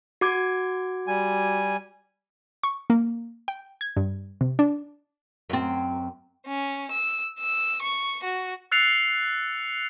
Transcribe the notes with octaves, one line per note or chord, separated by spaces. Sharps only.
F#4 D6 G#6
G3 G#5
C#6
A#3
G5
G#6
G2
C3
D4
F#2 C4
C#4
E6
E6
C#6
F#4
E6 F#6 A6 C7 C#7 F7